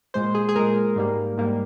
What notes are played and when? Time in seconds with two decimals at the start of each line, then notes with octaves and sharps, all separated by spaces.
0.14 A#2 G#3 C5
0.35 G#4
0.49 G#4
0.55 A#2 G#3 A#4
0.96 G#2 G3 A#3
1.37 G#2 G3 A#3